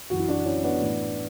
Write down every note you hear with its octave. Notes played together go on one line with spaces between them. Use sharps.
F#2 E3 F#4
E4
D4 F#4
C#4 E4
B3 D4
A2 E3